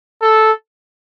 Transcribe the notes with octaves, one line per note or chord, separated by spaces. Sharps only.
A4